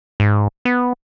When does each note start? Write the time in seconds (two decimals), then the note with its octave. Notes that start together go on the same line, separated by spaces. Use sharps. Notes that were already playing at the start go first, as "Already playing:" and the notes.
0.20 G#2
0.65 B3